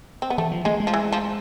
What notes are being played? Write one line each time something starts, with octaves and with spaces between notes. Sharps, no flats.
C4
B3
E3 A3
F3
G#3 A3
G#3
F3
E3
F3